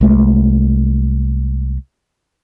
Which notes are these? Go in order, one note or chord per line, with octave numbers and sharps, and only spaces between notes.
C2 G#3 A3